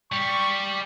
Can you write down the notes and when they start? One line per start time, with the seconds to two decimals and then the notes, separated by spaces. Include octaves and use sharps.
0.12 G3 C#6